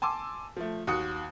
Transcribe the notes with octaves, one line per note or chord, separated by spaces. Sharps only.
G#5 A5 C6 D6 E6
F3 A3
D#2 F#4 D#6 C#7